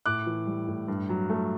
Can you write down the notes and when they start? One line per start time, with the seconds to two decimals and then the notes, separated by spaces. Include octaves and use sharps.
0.06 A2 D6 F#6
0.26 E3
0.47 G3
0.67 A2
0.88 G2
1.09 F#3
1.30 A3